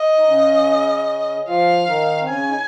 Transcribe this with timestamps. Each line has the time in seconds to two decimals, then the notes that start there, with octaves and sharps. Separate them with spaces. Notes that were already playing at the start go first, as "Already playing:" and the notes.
Already playing: D#5
0.18 D#4
0.29 C#3 C#4
1.48 F3 F4 F5
1.88 D#3 D#4
2.21 C4
2.28 C#3 C#4 G#5
2.49 D#4